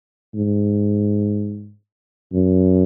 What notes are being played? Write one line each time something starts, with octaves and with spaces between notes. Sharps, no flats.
G#2
F#2